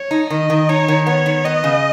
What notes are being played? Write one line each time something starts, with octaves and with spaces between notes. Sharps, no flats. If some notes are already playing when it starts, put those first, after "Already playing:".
Already playing: C#5
D#4
D#3 D#5
D#3
D#4 C#5
D#3
B3 C#5
D#3
B3 D#5
C#3